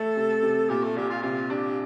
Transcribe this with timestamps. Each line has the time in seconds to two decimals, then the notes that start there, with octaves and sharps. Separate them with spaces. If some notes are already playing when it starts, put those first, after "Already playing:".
Already playing: A3 A4
0.16 C3
0.43 C3
0.69 A#2 G4
0.83 A3
0.96 A#1 G4
1.10 F4
1.23 C3 F4
1.50 D4 G4